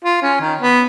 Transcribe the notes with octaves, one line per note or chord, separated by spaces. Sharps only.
F4
C#4
D#3
B3